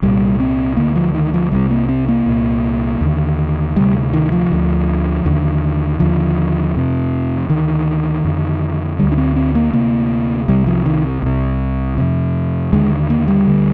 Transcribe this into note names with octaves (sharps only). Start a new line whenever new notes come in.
C2 A#2 G3
C4
D2 D3 A#3
F3
D#3
F3
C2 C3 G3
A#3
C4
A#3
C2 A#2
D#2 D3
D2 C3 G3
D#3
F3
D2 D3
D#2 D3
D#2 D3 F3
F2 C3
D2 D3 D#3
F2 D3
D2 D3 G3
D4
C4
C4
A#3
D2 C3 A#3
C2 C3 G3
F3
D#3
C2 C3
F2 C3
D#2 D3 G#3
A#3
G3
D2 D3